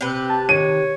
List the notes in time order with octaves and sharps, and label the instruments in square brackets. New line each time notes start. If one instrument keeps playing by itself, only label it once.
[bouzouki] C3 G4 B4 [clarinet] C4
[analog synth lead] A5
[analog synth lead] D#3 [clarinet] C#5 [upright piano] D#7